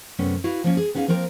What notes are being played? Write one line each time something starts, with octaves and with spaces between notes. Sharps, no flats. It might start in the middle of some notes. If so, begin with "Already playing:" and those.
F#2 C3 A3 B3 C#4
E4 F#4 B4 F5
F3 A#3 C#4
G#4
B3 C#4 D#4 G#4 F5
F3 A#3 C4 A#4 G#5 A#5